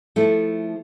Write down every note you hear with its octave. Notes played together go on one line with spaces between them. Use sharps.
F3 A3 E4 A4